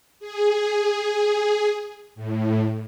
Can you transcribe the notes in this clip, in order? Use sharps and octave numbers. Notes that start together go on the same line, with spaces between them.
G#4
A2